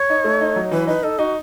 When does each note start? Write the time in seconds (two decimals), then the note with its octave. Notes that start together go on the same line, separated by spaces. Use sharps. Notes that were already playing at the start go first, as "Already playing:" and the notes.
Already playing: C#5
0.10 D#4
0.24 A3
0.41 D#4
0.56 F#3
0.71 E3 B4
0.87 D#4 B4
1.03 D#4 A4
1.19 D#4 F#4